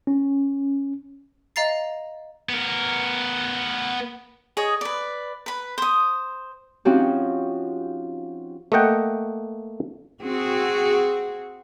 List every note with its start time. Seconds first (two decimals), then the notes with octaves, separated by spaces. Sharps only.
0.07 C#4
1.56 D#5 F5 A#5 A6 C7
2.49 B3 A#4
4.57 G#4 C#5 D#5
4.81 B4 D5
5.46 B4 B5
5.78 C5 D#6
6.85 F3 C4 C#4 D#4 F#4 G4
8.72 A3 A#3 D#5 F#5 G5
10.22 C4 F#4 G#4